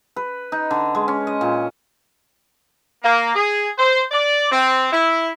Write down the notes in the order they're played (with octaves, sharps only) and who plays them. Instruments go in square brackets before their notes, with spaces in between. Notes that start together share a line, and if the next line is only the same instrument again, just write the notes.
[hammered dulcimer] B4
D#4
D3
G#3
C#4
D#5
A#2
[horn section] A#3
G#4
C5
D5
C4
E4